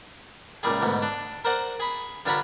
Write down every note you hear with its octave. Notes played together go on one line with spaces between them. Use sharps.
C#2 A#2 G3 G#4
D2 G#2 B2
D4
A#4 C5 D5 F#5
G#4 B5
G2 D3 F4 C#5 A#5 B5